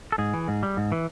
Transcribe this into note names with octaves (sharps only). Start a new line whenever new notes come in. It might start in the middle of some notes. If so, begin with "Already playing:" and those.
A4
G#2 G#4
E3
G#2
G3
G#2
E3